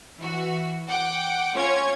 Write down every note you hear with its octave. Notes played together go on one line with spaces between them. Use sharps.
E3 F#4
F#5 G5 D6
C#4 F4 C#5 G#6